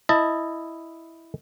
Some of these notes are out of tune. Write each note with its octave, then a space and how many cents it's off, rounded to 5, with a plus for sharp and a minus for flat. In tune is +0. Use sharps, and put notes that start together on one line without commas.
E4 +0 D#5 +0 A5 +25